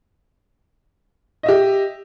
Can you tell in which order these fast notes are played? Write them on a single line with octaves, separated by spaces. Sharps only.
D#5 E5 G4